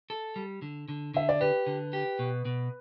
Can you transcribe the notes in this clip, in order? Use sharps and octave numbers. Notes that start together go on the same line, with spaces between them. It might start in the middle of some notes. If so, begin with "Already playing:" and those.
A4
G3
D3
D3
D3 E5
D5
G4 B4
D3
G4
B2
B2